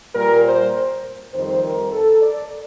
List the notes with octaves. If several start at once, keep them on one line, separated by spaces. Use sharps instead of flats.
A#2 G3 A#4
C5
F2 D#3 G3 C5
A#4
A4
D5